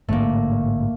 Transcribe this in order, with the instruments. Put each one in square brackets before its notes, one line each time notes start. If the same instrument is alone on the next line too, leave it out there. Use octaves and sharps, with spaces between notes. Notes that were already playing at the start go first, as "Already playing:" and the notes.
[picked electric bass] A1 G#2 D3 [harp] A3 A#3